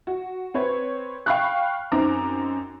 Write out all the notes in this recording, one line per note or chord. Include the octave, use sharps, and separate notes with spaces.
F#4
C4 B4 C#5
F5 G5 B5 C#6 F6 F#6
F#2 C4 D#4 A#5 D6